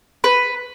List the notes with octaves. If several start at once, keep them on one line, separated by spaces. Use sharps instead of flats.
B4